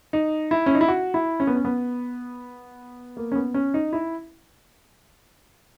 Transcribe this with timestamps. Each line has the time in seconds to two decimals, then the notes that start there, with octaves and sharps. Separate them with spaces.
0.13 D#4
0.51 E4
0.66 C#4
0.75 D#4
0.81 E4
0.88 F#4
1.14 E4
1.40 C#4
1.47 B3
1.55 C#4
1.65 B3
3.17 A#3
3.32 C#4
3.35 B3
3.54 C#4
3.74 D#4
3.93 E4